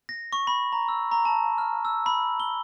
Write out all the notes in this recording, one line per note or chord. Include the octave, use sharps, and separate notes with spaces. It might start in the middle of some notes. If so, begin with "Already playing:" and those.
A#6
C#6
B5
A#5
E6
A#5
A5
F6
E6
B5
G7